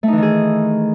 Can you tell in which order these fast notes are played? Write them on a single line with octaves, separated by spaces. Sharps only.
A3 D#4 E3 D#3 G#4